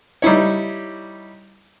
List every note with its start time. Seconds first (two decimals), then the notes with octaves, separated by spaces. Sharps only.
0.22 G3 D#4 E4 C#5